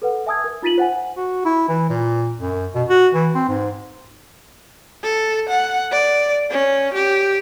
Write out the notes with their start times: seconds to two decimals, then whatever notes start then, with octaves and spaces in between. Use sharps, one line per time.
0.02 A4 B4 F#5
0.27 E5 G#5 A5 D#6 E6 G#6
0.44 A#4
0.62 D#4 F4 A6 B6 D#7 F#7
0.78 C5 F#5 G#5
1.17 F#4
1.45 E4
1.69 E3
1.90 A#2
2.40 F#2
2.75 B2
2.89 F#4
3.14 E3
3.35 C4
3.48 G#2
5.04 A4
5.49 F#5
5.92 D5
6.51 C#4
6.94 G4